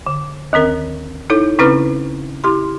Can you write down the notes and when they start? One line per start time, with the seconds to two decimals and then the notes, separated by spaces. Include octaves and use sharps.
0.07 D3
0.53 D#2 D#3 C4 A#4
1.30 D#4 E4 A4 C#5
1.59 C#3 C4 C#4 E4 B4 F6
2.44 E4 G4 C6